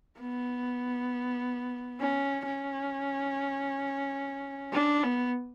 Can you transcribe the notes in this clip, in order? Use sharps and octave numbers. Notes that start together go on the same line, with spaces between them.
B3
C#4
C#4
D4
B3